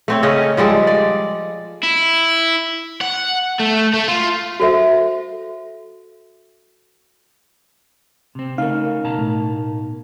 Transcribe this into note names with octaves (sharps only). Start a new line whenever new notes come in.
A3 C4 C#5
C#3 C#4 C#5 D#5
F3 G3 G#3 A4
D5
E4
F#5
A3
A3
F4
F#4 A4 C5 E5 F5
C3 C4
C#3 A3 C#4 D#4 A#4 F5
B2 A5 A#5
A2